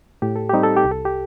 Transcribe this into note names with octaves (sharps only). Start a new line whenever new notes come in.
A2 G4
A4
G3 C4 D#4 G4
A4
G4
C2
A4
G4